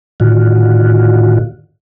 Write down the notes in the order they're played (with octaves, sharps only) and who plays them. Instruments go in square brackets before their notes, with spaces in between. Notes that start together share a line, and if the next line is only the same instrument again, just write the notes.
[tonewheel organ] A2 D3 D#3 F4 F#4